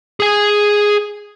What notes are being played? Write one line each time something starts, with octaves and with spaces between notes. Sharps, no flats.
G#4 G#5